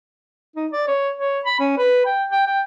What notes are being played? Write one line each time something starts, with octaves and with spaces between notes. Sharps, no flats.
D#4
D5
C#5
C#5
B5
C#4
B4
G5
G5
G5